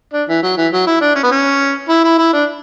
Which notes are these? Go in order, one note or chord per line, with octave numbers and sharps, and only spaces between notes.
D4
E3
F#3
E3
F#3
E4
D4
C#4
B3
C#4
E4
E4
E4
D4